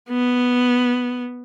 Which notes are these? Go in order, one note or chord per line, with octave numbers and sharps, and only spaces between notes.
B3